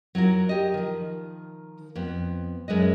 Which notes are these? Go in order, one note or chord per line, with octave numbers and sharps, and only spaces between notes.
F#3 E4 F4 A#4
G4 D#5
D#3 F3
F2 B3
F#2 G#3 B4 D#5